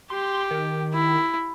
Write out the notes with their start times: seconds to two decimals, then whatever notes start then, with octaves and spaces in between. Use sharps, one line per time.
0.10 G4 C6
0.51 D#3
0.94 E4